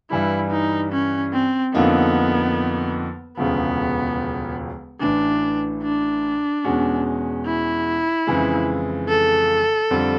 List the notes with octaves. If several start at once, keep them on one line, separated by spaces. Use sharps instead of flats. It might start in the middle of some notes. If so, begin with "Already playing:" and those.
G2 E3 G3 E4
D#4
C#4
C4
F2 D3 F3 A#3 B3 D#4
E1 D2 C#3 F3 B3
A1 A2 E3 D4
D4
E2 B2 G#3 C#4 F#4
E4
F2 C#3 E3 G#3
A4
F2 D3 G3 C4